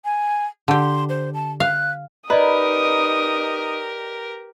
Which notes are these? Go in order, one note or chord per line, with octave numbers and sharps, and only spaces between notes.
G#5
D3 G4 C6
C5
A5
F5 F#6
D#4 G4 A#4 B4 D5 D#5 A#5 D#6